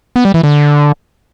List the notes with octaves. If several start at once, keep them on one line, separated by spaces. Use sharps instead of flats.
B3
G3
E3
D3